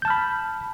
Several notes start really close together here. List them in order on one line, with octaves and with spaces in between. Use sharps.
G6 A5 F6 B5